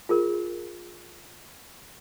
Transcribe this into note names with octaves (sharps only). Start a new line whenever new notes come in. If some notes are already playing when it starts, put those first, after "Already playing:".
F4 G#4 A#4